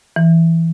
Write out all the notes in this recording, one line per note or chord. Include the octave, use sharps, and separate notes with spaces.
E3